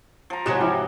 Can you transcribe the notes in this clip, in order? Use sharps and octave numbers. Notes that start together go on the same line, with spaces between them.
F3 A#5
G#2 C3 F#3 G4 D#5 G#5 F#6 E7
F3 G3 E4